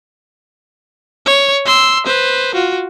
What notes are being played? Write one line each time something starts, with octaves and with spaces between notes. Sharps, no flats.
C#5
C6 E6
B4 C5
F4 F#4